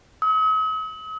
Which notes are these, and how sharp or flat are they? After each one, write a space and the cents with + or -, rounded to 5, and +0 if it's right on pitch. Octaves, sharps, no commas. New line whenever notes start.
D#6 +45